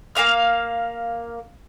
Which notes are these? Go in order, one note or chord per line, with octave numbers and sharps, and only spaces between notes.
A#3 G#4 F5 F6